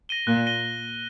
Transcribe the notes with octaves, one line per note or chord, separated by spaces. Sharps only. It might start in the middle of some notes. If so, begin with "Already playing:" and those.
A#6 D#7 G7
A#2 F#6
A#6 D#7 G7